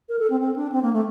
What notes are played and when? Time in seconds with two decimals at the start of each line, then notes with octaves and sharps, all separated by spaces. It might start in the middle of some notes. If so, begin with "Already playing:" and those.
0.09 A#4
0.19 A4
0.30 C4
0.40 C4
0.56 D4
0.72 C4
0.82 A#3
0.93 A3